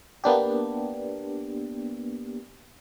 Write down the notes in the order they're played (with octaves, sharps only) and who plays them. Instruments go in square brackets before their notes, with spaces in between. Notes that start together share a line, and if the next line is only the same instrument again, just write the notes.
[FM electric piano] A#3 B3 D4 G4